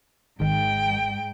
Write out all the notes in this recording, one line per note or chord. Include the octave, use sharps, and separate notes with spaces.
G#1 G#2 D#3 G5